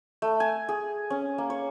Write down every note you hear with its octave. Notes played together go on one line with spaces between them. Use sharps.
A3
G#5
G#4
C#4
A#3
C#5